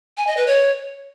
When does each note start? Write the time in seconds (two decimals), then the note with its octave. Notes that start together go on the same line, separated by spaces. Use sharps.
0.17 G#5
0.27 D#5
0.37 B4
0.47 C#5